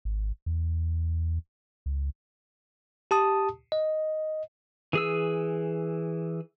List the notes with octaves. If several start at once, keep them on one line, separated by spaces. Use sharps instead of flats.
G#1
E2
C#2
G4 A5 D#6
D#5
E3 G#4 E6